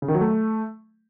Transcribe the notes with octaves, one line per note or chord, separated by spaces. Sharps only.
C#3
D#3
F#3
A3